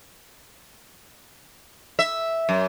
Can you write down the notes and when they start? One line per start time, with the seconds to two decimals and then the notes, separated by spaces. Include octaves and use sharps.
1.99 E5
2.49 F#2